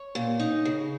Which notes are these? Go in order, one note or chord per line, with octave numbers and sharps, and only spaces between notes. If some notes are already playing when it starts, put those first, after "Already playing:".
Already playing: C#5
A#2
D#4
C#3